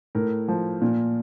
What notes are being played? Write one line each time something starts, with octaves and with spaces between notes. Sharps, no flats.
A2 A#4
F3
A#2